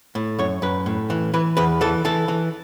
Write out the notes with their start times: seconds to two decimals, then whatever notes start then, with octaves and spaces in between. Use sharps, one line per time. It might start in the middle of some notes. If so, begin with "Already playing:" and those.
0.15 A2
0.39 F#2 C#5
0.62 F#2 B4
0.86 A2
1.10 E3
1.34 E3 B4
1.57 E2 B4
1.81 E3 A4
2.05 E3 A4
2.28 E3